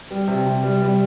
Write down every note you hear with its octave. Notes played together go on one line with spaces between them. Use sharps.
G3
C3
C3
G3
G3